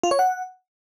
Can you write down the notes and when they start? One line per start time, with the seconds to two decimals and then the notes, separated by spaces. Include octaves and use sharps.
0.03 F4
0.11 C#5
0.19 F#5